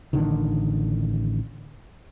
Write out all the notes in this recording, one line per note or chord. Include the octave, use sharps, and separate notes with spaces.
A1 D3 D#3